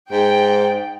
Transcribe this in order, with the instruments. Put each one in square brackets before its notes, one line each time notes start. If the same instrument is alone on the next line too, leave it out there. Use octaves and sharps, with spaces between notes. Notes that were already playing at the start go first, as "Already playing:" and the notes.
[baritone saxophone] G#2 [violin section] G5